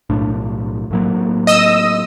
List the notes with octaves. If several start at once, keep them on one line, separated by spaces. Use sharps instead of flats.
B1 A2 D4
A2 F#3 A#3
D#5 D#6 E6